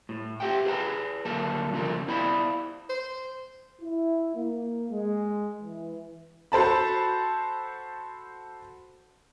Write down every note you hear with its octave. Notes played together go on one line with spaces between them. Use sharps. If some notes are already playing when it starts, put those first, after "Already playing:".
A2
G4 E5 F#5 G5
G#4 B4 C5 E5 A5 A#5
D2 F#3 A#3 A4 A5
F2 C#3 F3 A3 A#4
B3 E4 C5 D5 F5 B5
C5
E4
A#3
G#3
E3
F#4 A4 C5 A5 B5